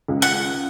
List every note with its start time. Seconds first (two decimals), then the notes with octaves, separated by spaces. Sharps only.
0.08 C#2
0.22 F#5